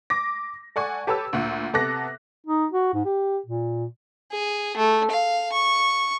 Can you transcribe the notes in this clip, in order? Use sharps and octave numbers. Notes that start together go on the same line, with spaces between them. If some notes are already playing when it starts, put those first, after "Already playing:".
D6 A#6
A4 D5 F#5 G#5 C#6
G4 A4 B4 C#5 A5 E6
D2 A#2 F#5
C3 B3 A4 D6 F#6 A#6
D#4
F#4
G#2
G4
A#2
G#4
A3
F5
C#6